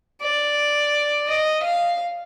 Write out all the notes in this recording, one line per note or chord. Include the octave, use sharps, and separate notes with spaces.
D5
D#5
F5